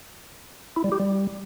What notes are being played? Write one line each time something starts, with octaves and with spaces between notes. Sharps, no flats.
E4
G3
G4
G3